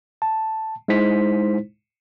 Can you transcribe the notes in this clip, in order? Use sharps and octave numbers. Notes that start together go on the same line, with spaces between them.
A5
G#3 D#4 E4 C5 B6